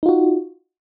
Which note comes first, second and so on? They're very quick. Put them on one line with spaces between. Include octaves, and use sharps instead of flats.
D#4 F4 F#4